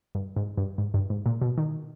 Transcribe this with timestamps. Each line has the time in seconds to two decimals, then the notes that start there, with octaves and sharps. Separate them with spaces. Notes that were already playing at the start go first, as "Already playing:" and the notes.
0.15 G2
0.36 G#2
0.57 G2
0.78 G#2
0.94 G2
1.10 G#2
1.26 A#2
1.42 B2
1.58 D#3